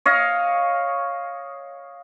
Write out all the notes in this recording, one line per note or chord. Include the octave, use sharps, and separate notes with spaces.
C#5 D#5 F5